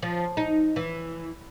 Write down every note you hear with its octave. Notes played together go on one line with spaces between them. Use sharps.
F3
D#4
E3